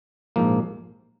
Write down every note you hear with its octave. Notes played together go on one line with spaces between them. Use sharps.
A#1 G#2 F3 A#3